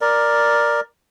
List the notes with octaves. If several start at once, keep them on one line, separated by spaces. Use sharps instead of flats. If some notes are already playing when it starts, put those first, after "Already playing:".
A#4 D5